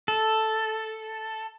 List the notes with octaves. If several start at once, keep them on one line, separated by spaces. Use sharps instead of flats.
A4